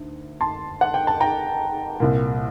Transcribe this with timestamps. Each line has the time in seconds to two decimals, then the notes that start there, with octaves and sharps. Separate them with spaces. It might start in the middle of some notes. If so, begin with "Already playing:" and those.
Already playing: D2 D#3
0.41 A5 C6
0.81 F#5
0.94 G5
1.07 A5
1.20 G5 A#5
2.00 C2 A#2